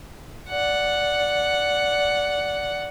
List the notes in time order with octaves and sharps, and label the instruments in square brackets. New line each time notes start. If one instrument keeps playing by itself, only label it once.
[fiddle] D5 F#5